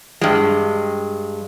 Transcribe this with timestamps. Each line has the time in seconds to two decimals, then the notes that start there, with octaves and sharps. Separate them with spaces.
0.21 G2 G#3